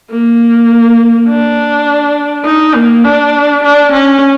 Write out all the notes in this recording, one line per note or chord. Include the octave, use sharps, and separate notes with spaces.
A#3
D4
D#4
A#3
D4
D4
C#4